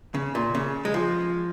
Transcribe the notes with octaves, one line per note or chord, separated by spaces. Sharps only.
C#3
A#2
C#3
G#3
F3